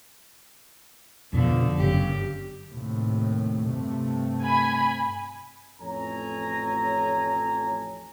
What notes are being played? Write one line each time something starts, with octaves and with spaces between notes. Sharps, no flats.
F2 B2 D3 F3
G1 F#2 C#3 G4
D#2 A2 C3
G2 C3 A3
G#5 B5
A1 F2 A4 C#5 G#5 A#5